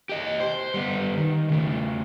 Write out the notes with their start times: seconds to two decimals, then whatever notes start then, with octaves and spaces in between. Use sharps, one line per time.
0.09 G4 D#5
0.40 C5
0.74 G3 B3
1.17 D#3
1.49 C#3 A3